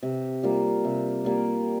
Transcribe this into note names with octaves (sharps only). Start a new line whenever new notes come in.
C3
G3 A#3 F4
C3
G3 A#3 F4